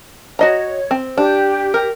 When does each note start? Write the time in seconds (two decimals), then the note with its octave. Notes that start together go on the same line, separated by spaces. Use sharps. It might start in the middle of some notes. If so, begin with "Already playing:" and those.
0.39 F#4 C#5 D#5 A#5
0.91 C4
1.17 D4 G4
1.74 A#4